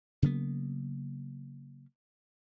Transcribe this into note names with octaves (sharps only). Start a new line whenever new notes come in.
C#3 F#3 A#3 B3